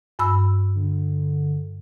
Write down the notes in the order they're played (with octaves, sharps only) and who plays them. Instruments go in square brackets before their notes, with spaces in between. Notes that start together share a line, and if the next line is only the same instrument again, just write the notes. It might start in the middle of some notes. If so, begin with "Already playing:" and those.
[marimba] G2 B5 E6
[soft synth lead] D3